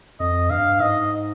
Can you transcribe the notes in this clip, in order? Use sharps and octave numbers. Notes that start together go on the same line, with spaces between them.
F2 D#5
G2 F5
G#2 D#5